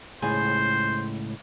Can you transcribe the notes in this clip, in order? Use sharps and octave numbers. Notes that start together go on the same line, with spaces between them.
C#2 A2 G#4 C5